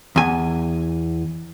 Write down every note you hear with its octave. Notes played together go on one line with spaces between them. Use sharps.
E2 G#5